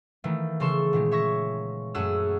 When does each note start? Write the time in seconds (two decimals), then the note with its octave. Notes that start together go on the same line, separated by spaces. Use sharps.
0.24 D#3 E3 A3 A#3
0.60 C#3 E3 A4 C6 C#6 E7
0.93 A#2 D#3 G#3
1.11 C#5 E5 C#6 A#6
1.94 F#2 A3 F#4 G#4 E6